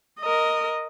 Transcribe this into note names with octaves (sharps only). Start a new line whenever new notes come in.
A#4 D#5